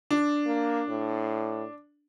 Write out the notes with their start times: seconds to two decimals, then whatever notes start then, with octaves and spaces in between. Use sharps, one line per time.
0.11 D4
0.46 A#3
0.89 A2